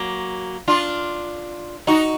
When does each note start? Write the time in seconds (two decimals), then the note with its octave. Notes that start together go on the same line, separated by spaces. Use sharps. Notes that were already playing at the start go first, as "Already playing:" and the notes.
Already playing: F#3 A#3
0.68 D4 F4
1.87 D#4 F#4